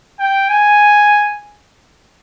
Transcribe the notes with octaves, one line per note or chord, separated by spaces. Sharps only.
G5
G#5